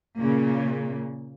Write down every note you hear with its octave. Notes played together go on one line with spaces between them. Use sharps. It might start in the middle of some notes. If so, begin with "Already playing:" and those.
A#2 C#3 A#3